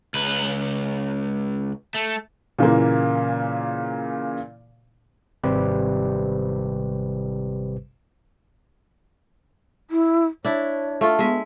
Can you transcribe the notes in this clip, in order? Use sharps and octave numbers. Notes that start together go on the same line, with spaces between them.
C#2 B4
A3
A#2 C#3 E3 A#3
G#1 C3 G3 G4 B4 C5
E4
D4 E4 C#5
A3 F4
G#3 B3 E5